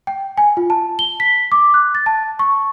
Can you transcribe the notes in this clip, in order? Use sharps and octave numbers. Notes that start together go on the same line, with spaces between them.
G5
G#5
F4
A5
G7
B6
D6
F#6
A6
A5
C#6